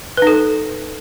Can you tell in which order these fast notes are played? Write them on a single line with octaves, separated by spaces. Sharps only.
B4 D#4 A4